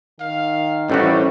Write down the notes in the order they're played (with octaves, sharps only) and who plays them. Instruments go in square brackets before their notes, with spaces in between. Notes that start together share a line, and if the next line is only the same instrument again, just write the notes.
[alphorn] D#3 [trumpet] F5
[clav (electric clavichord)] A1 A3 F#4 [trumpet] G3 [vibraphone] C#4 E4 C5